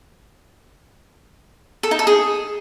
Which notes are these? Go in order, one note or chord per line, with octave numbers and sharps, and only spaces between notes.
A4
D#4
A4
G#4